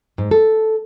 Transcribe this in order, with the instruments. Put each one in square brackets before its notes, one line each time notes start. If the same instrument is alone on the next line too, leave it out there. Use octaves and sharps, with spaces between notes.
[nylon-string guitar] G#2
A4